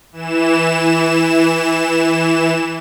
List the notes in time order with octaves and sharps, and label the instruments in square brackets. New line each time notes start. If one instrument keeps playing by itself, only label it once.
[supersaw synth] E3 E7